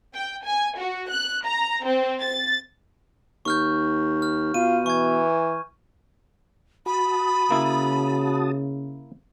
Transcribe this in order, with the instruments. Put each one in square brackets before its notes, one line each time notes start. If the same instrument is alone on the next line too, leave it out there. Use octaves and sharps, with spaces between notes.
[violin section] G5
G#5
F#4
F#6
A#5
C4
A6
[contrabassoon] D#2 [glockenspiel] C#6 F6 G6
[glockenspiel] F6
[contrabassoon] B2 [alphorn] F4 [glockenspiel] D#7
[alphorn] E3 [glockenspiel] C#6 G#6
[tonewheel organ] F#4 A5 D#6 [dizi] B5
[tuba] C#3 [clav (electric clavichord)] A#3 E4